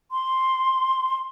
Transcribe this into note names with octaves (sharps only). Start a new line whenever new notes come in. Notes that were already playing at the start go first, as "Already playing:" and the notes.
C6